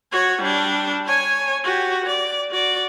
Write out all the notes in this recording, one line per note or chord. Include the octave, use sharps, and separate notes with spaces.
F#4 C#5
G3 D4
C#5 G#5
F#4 G4
D5
F#4 D5